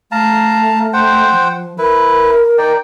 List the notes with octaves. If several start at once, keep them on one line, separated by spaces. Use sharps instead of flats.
A3 F5 A5 A#5
C5 F#5 G5
F3
E4 A#4 B4
D#4 D5 G5